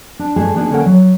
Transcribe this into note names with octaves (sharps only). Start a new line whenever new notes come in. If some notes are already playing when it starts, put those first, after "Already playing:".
D4
G2 A3 G#4 A5
A#3 B3 D4 D#4 G4 G#4
D3 A#3 C#4 A4 A#4 F#5
F#3